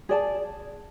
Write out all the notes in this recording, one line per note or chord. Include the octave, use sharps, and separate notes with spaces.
G#4 D5 A5